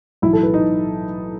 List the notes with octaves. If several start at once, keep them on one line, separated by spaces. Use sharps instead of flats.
B1 A2 E3 E4
A4
B4
D#4